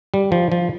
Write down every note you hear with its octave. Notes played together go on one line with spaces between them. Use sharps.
G3
F3
F3